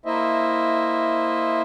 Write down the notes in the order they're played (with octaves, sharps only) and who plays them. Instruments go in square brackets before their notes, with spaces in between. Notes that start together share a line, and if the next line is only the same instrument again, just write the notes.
[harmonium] A#3 E4 C5 D#5 E5